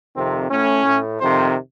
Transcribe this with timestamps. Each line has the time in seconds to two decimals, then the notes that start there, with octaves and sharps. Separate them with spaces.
0.15 F2 C3 D#3 C4
0.49 A2 C#4
0.85 A2
1.20 F2 C3 D#3 C5